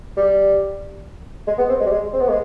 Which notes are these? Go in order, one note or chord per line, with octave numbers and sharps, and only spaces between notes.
G3
G#3
B3
C4
G#3
G3
G#3
C4
B3
G#3